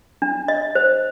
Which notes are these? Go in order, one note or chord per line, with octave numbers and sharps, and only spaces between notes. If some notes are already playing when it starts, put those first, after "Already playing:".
D4
D#5
C5